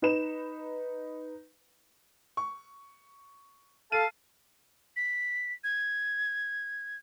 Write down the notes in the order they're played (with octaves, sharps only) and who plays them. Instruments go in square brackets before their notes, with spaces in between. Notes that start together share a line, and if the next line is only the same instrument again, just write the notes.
[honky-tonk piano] D#4 B4 E7
[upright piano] C#6
[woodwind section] A4 F5 A5 [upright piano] D#7
[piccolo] B6
G#6